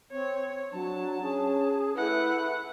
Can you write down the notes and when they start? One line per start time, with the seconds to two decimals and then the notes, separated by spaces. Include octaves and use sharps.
0.11 C4 C#5
0.72 F#3 D4 A5
1.22 C#4 G#4
1.96 A3 E4 B4 F#5